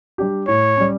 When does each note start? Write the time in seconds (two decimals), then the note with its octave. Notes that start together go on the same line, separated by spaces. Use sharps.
0.18 G3 D4 G4
0.48 A2 C#5
0.77 G3 C#4